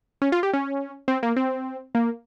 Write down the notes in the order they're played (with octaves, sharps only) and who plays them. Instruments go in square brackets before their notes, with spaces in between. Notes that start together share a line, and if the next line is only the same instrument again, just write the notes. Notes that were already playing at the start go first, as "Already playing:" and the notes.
[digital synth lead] C#4
F4
G4
C#4
C4
A#3
C4
A#3